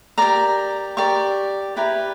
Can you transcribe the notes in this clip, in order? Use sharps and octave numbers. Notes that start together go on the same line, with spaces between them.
G4 A#4 D5 A#5
G4 A#4 D5 C#6
E4 G4 B4 D5 A#5